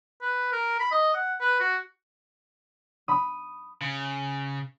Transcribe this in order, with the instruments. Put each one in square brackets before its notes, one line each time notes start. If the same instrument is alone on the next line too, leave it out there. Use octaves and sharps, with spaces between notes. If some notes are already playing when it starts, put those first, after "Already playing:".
[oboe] B4
A#4
B5
D#5
F#5
B4
F#4
[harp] B5 D#6
[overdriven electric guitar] C#3